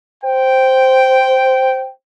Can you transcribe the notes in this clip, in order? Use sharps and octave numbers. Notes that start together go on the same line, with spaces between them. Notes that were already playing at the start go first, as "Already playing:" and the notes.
C5 G5